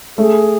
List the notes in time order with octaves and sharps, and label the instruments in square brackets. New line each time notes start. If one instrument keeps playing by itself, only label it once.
[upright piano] A3 [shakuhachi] G#4